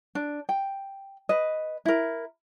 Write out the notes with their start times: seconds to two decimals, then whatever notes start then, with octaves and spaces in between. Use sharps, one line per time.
0.15 D4
0.49 G5
1.29 B4 D#5
1.85 E4 A#4